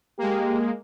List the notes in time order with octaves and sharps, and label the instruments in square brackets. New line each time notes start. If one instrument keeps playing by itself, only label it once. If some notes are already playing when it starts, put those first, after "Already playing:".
[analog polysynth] G#3 A#3 [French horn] G4